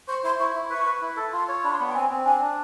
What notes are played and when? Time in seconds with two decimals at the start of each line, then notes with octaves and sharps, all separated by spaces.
0.08 C5 C#6
0.24 E4 C6
0.39 E4 C#6
0.56 E4
0.70 B4 C#6
0.86 B4
1.02 E4
1.16 A4
1.33 F4 C6
1.48 C#5
1.64 D4 B5
1.71 C6
1.78 B3 B5
1.87 G5
1.95 C4 G#5
2.10 C4
2.25 D4 G#5
2.41 D4